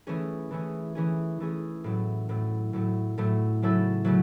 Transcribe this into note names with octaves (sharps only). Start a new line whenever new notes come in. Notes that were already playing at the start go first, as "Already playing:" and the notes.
E3 A3 C#4 G#4
E3 A3 C#4 G#4
E3 A3 C#4 G#4
E3 A3 C#4 G#4
A2 F#3 A3
A2 F#3 A3
A2 F#3 A3
A2 F#3 A3
C#3 F#3 A3 E4 A4
C#3 F#3 A3